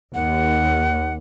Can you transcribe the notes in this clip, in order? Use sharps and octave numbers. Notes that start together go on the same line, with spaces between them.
D#2 F#5